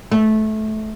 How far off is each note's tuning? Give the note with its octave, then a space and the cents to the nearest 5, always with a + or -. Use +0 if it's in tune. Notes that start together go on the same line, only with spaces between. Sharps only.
A3 -20